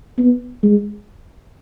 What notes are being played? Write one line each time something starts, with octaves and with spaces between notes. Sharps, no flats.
B3
G#3